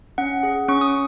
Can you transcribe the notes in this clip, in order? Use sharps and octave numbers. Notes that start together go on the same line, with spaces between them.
C#4 F#5
G#4
C#4 C#6
D#6